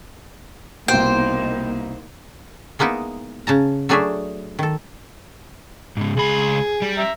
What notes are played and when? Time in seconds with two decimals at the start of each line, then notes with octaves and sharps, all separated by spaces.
0.88 C2 B2 A#3 B3 D#4 C5 G5
2.79 G#3 A#3 B3 D#4 E4
3.47 C#3 A5 A#5
3.89 F#3 A3 D4 G#4 D5 E5
4.59 D#3 A4
5.97 G#2 C#3
6.17 C#2 G#4 B5
6.82 G3
6.98 E5 A#5